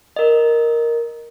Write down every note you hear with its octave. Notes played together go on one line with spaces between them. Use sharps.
A#4 D#5